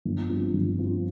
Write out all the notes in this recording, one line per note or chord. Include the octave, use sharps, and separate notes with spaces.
G1
G2 F3 C4 F4
G1
G2 F3 C4 F4